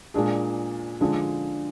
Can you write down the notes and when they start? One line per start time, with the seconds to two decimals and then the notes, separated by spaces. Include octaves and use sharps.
0.14 A#2 G#3 D4 G#4
1.01 D3 F3 G#3 D4